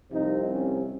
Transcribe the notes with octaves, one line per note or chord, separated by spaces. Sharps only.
C2 C3 F3 D#4
C#4